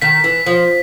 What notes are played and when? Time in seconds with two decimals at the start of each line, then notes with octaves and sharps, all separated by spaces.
0.02 D#3 B6
0.24 E3
0.46 F3